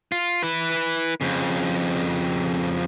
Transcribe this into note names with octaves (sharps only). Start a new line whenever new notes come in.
F4
E4 B4
F2 C#3